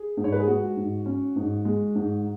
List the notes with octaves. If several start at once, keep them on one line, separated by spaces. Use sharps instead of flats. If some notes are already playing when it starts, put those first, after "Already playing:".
Already playing: G#4
G#2
C#5
B4
G#4
G#3 F#4
G#2
C#4
G#2
G#3
G#2